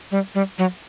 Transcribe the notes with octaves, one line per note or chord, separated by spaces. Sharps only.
G3
G3
F#3